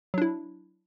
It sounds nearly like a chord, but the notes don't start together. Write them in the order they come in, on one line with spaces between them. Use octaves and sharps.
F#3 D4 E4